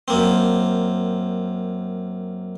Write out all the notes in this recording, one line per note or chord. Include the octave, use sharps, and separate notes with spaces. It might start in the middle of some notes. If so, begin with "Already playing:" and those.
F#2 A#3 C4